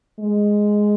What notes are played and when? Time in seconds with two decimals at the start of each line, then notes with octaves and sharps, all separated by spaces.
0.20 G#3